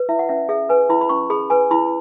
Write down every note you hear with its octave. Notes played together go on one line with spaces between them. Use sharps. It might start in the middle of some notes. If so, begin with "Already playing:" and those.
Already playing: B4
E4 E5
F#5
C#4 E5
G#4 E5
B4 G#5
E4 B5
B5
C#4 C#6
G#4 B5
B4 G#5
E4 B5